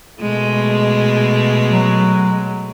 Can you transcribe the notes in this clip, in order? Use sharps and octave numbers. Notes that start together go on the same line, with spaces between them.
B2 G#3 A3
F#3